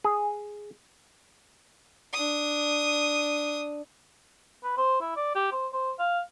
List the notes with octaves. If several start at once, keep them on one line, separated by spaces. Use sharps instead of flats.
G#4
D4 D#6
B4
C5
E4
D5
G4
C5
C5
F5